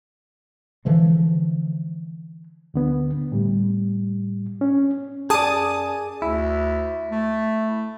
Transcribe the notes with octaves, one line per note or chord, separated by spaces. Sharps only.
D3 E3 F3 G#3
D2 D3 B3
A2 G3
C#4
F#2 G#4 D5 A5 D#6 D#7
D2 E4
A3